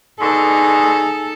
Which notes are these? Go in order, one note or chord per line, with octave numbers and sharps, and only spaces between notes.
B2 D3 D#4 G#4 A4